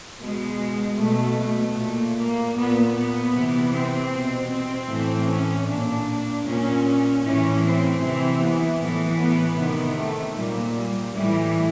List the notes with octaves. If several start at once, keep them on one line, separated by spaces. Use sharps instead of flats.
B2 G#3
B2 A3
A3
A#2
A#3
A#2 B3
B3
C3 E3
C4
B2
C4
A2 E3
C#4
A#2 D4
A#2 C#4
A2 E3 C#4
C4
C3 E3
B3
A2 E3
B3
C3 D#3
A3
A#2 G3
G3
A2 E3 G3